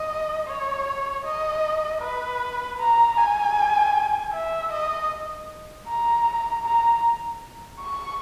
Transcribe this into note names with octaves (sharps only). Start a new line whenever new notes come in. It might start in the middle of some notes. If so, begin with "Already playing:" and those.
Already playing: D#5
C#5
D#5
B4
A#5
G#5
E5
D#5
A#5
A#5
C#6